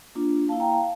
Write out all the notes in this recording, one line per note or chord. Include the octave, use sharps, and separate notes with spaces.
A#3 D4 F4
A#3 E4 F5 A5
G5 A#5
F5 A5